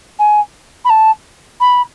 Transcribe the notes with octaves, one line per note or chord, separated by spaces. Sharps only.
G#5
B5
A5
B5